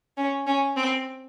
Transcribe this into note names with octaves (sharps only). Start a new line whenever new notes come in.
C#4
C#4
C4